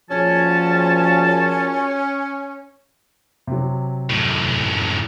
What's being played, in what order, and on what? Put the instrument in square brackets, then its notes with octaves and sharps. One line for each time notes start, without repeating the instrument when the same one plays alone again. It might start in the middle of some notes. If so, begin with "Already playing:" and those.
[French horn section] A#2 F#4 G#4 [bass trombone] F3 [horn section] C#4 [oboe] A5
[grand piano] C3 F#3
[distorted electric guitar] F#2 A2